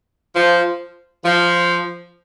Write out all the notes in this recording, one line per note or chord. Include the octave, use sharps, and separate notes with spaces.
F3
F3